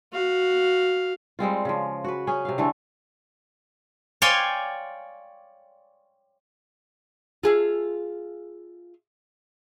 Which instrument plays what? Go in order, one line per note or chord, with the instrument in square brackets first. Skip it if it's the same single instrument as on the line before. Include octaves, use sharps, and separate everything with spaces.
[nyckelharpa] F#4 F5
[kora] G3 G#3 C4 F4
C#3 F3
F#4 B4
C#4 G#4
C3 F5
D3 E3 A3
[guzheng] C#5 D5 F5 G5 G#5 C6
[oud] F4 G#4 E5